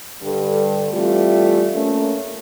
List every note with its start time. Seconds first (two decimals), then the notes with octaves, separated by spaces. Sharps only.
0.22 G2 D3 G3 A4
0.92 E3 G3 A3 C4 F4
1.75 A3 A#3 C#4